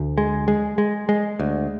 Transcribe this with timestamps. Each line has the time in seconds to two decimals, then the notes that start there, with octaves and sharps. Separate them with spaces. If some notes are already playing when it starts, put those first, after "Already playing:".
Already playing: D2
0.18 G#3
0.48 G#3
0.78 G#3
1.09 G#3
1.39 D2